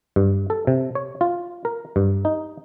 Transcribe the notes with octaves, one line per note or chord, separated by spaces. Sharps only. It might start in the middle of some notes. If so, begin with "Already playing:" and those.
G2
A4
C3
C#5
F4
A#4
G2
D#4